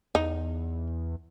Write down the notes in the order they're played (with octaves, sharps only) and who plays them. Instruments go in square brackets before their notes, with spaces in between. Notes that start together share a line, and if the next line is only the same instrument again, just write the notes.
[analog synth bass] E2 [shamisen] D#4